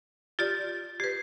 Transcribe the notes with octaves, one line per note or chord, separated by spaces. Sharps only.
F4 G4 D5 A6
G4 B4 G#6 C7